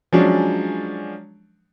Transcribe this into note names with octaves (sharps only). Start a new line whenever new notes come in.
F3 F#3 G#3 C#4 D4